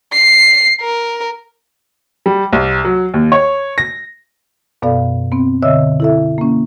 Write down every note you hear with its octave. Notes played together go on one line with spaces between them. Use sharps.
C7
A#4
G3
C2
F#3
D#2
C#5
A#6
F#2 B2 B3 A4 D5 F5
B3 C4
B2 D3 C#5 D#5 E5 E6
E4 A4 E5
A#3 C#4